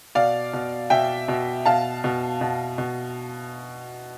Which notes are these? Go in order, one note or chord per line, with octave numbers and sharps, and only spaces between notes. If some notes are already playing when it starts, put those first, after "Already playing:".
B2 D5 F5
B2
B2 E5 G5
B2
B2 F5 A5
B2
B2
B2